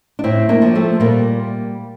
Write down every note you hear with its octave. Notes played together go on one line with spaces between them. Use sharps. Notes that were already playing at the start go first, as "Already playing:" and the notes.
D4
A2 C4 E4
A#3 D4
F3
A3 C4
A#2 G3 A#3